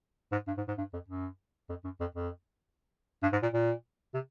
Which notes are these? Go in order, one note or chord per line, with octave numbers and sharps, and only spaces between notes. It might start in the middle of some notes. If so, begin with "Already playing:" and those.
G#2
G2
G#2
G#2
G2
F2
F#2
F2
F#2
F2
F2
G2
G#2
A#2
A#2
C3